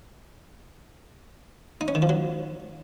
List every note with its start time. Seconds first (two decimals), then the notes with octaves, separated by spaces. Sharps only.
1.81 D#4
1.88 C#4
1.95 D#3
2.02 F3
2.09 F#3